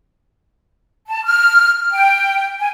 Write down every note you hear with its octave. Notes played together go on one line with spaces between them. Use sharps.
A5
F6
G5
G#5